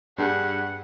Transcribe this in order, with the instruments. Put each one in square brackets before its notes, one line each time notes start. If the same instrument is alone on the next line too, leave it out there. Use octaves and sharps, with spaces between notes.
[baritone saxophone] G2 [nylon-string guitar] D4 G#4 [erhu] F#5